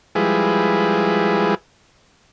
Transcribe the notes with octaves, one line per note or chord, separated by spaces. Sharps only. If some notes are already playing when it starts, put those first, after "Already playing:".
F3 G3 G#3 E4 G#4 B4